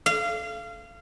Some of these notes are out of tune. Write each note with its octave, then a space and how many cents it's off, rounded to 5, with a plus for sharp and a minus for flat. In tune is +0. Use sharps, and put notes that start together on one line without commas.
F5 -25